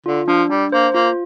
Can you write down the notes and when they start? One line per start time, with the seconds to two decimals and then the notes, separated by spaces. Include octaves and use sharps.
0.06 D3 F4
0.28 F3 D4
0.49 G3 D4
0.72 A#3 C5
0.94 A#3 F4